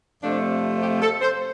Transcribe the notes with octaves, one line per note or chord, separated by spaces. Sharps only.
F2 C3 F3 A3 D4
G4
A4
C5